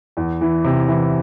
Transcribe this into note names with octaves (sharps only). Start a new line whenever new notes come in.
E2
E3
C3
E3